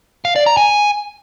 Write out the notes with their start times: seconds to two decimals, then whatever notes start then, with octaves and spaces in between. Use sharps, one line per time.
0.25 F5
0.36 D5
0.46 A#5
0.57 G#5